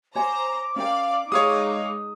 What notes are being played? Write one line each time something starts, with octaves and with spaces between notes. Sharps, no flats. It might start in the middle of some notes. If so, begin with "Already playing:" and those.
C5 C#5 G#5 A#5 D6
C#4 A#4 D5 F5 G5
G#3 D#4 G#4 C#5 F5 D#6